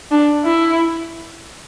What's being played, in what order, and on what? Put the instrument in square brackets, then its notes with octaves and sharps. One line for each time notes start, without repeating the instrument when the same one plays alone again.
[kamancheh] D4
E4